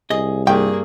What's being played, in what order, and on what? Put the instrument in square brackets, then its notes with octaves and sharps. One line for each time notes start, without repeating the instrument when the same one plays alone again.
[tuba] C2 [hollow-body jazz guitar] G#4 D#5
[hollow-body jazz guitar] G2 [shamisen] F3 G5 [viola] A#3 G#4